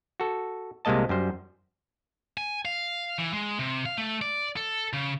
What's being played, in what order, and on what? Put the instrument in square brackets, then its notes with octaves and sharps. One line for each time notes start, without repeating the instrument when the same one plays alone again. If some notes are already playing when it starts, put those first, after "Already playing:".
[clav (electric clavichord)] F#4 A4
C2 C3 G#3 A#3 D#5 A5
F#2 G3 C5
[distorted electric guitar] G#5
F5
E3
G#3
C3
F5
A3
D5
A4
C#3